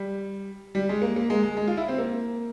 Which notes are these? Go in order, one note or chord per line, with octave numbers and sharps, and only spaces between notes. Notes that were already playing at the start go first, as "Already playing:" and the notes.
Already playing: G3
G3
G#3
A#3
A#3
G#3
G#3
G#3
F4
E4
C4
A#3